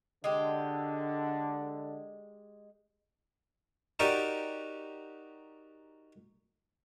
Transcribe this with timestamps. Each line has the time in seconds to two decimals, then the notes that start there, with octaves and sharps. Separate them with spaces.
0.24 D3 G#3 G4
3.99 D#4 F#4 G4 A#4 D5